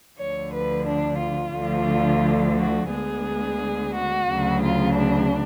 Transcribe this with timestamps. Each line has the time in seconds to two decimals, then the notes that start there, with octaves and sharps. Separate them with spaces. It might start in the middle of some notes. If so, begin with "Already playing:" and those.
0.18 D2 D3 F3 C#5
0.53 B4
0.86 D4
1.20 F4
1.54 D2 D3 F3 A3
2.57 F#4
2.91 D2 D3 G#3 B3 G#4
3.94 F#4
4.28 D2 C#3 F#3
4.61 F4
4.96 D4